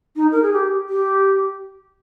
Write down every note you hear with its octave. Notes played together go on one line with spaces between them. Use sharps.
D#4
A#4
G#4
G4
G4